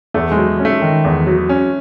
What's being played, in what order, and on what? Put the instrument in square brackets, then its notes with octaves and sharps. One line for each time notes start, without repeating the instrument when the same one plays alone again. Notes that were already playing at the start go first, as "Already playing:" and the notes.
[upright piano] E2 [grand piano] A3
[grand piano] G#3
[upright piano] F#3
C#4
[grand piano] A3
[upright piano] D#3
E2
F#3
C#4